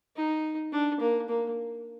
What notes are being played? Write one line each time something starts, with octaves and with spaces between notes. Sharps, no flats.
D#4
D4
A#3
A#3